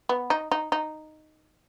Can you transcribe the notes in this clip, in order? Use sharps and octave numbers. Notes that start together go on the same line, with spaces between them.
B3
D#4
D#4
D#4